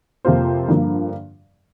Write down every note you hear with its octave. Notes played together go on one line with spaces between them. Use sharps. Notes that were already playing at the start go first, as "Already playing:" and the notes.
F2 C3 A#3 F4 C5
G2 D3 F3 A#3